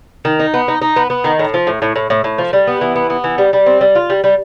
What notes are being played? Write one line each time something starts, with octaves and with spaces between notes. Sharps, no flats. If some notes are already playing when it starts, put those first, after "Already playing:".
D#3
D#4
B3
D#4
D#4
B3
B3
D#3
A2
F3
A2
A2
A2
A2
A2
F3
G3
B3
E3
B3
B3
E3
G3
G3
C4
G3
F4
G3
G3